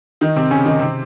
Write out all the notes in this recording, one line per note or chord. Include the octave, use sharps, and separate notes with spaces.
D#3 D#4
C3 C4
C#3 C#4
D#3 D#4
C3 C4